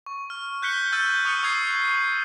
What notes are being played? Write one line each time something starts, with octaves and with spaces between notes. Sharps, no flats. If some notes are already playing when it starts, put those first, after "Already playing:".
C#6
F6
F#6 G6 B6 C#7 G7
E6 F6 G6 A6 D#7
C#6 D#6 F6 C#7
C#6 D#6 G#6 C7